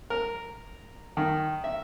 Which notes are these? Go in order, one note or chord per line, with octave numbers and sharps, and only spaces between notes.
A#4
D#3
E5